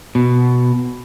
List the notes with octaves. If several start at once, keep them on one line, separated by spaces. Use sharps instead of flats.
B2